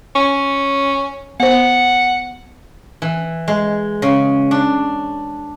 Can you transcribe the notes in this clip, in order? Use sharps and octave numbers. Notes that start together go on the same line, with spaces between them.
C#4
B3 C5 F#5
E3
G#3
C#3
D4